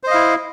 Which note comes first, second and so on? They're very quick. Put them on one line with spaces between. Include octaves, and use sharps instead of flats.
C5 D#5 F5 E4